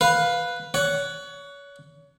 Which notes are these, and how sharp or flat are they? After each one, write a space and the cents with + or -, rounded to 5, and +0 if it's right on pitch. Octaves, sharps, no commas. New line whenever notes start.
B4 +0 F5 +10
C#5 +30 F#5 +0